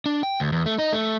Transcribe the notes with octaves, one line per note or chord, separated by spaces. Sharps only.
D4
G5
D2
E2
A3
D#4
A3